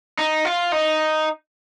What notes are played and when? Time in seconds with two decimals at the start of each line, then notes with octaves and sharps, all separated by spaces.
0.19 D#4
0.45 F4
0.72 D#4